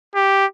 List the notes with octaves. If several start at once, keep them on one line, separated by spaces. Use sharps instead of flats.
G4